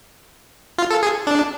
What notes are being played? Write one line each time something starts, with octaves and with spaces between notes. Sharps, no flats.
F4
A4
G#4
D4